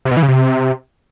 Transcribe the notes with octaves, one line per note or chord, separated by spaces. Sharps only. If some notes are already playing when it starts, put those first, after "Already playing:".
C3
B2
E3
C#3
C3